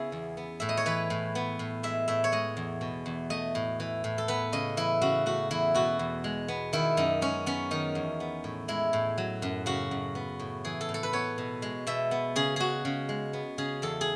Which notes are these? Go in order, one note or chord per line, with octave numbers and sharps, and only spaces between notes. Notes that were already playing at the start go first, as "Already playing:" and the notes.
Already playing: C#3 B3 E4 G#4
E2
B3
A2 E5
D#5
C#5
E3 B4
A2
B3
A2
G#3 E5
A2 E5
C#5
G#3 D#5
E2
B2
E2
A3 D#5
A2
E3
A2
A4
B3 B4
C#3 D#5
E3 E4
C#3 F#4
A3 F#4
E2 E4
B2 F#4
E2
G#3
B3
D#3 E4
F#2 D#4
G#3 C#4
B3 C#4
D#3 D#4
E2
B3
A2
G#3 E4
A2
F#3
F#2
C#3 F#4
F#2
B3
A2
E3 G#4
A4
A2
A4
B4
B3 C#5
B2
G#3
B2 E5
B3
C#3 G#4
G#3 F#4 G#4
C#3
G#3
B3
C#3 G#4
E2 A4
G#4